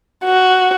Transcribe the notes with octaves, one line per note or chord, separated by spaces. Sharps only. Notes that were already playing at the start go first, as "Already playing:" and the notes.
F#4